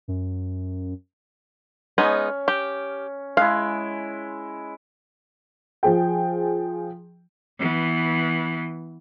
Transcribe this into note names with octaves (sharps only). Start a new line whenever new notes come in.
F#2
G#3 B3 C#4 D#4
G4
G#3 E4 F5
F3 G#4 G5
E3 B3